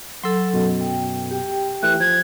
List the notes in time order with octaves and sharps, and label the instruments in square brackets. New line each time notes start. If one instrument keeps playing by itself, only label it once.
[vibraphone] F#3 A4 [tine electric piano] C6 E6
[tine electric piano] F#2 B2
[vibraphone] G5
G4 G5
[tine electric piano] E3 A3 [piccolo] F#6
[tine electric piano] F3 [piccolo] G#6